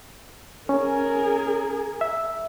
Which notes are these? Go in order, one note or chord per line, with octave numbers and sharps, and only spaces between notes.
C#4 G#4 A#4
E5